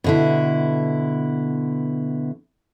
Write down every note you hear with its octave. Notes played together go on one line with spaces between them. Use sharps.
B2 D3 E4